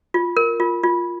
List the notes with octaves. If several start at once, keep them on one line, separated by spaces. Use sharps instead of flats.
F4
A#4
F4
F4